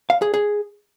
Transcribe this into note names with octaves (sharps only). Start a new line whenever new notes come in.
F5
G#4
G#4